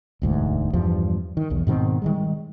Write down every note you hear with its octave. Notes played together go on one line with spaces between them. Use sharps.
E1 D2 G#2
E2 G2 F3 G3
D#3
B1 E2
G#2 B2 D#3 C4
D#3 G3 G#3